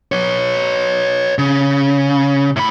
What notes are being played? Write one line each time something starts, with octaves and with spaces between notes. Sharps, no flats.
B4 C#5
C#3
A2 B5